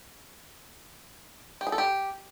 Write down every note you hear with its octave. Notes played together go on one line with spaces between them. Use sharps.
G4
G#4
A4
G4